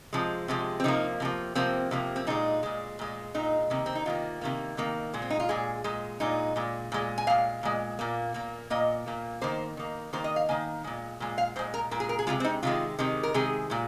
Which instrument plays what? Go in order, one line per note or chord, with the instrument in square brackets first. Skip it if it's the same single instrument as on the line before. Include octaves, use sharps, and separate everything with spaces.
[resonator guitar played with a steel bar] C3 F3 G#3
C3 F3 G#3
C4
C3 F3 A#3 D#4
C3 F3 A#3
C3 F3 A#3 C4
C3 F3 A#3
C4
A#2 G#3 D#4
A#2 G#3
A#2 G#3
A#2 G#3 D#4
C3 D#3 A#3
C4
D#4
C3 D#3 A#3 F4
C3 D#3 A#3
C3 D#3 A#3
A#2 G#3
C4
D#4
F4
A#2 G#3 G#4
A#2 G#3
A#2 G#3 D#4
A#2 G#3
A#2 G#3
G#5
A#2 G#3 F5
A#2 G#3
A#2 A#3
A#2 A#3
A#2 A#3 D#5
A#2 A#3
D#3 A#3 C5
D#3 A#3
D#3 A#3 C5
D#5
F5
D#3 A#3 G#5
A#2 G#3
A#2 G#3
F5
A#2 G#3 C5
A#4
A#2 G#3 A#4
G#4
A#4
G#4
C3 D#3 G#3 F4
C4
D#4
C3 D#3 G#3 F4
C3 D#3 G#3
A#4
C3 D#3 G#3 G#4
A#2 G#3